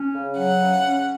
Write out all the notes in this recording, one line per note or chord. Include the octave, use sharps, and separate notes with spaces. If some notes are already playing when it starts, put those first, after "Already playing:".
Already playing: C#4
C#3
F#3 F#5
C#3
C#4